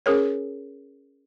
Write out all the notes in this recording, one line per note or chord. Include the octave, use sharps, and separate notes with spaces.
C#4 G#4 A#4 C#5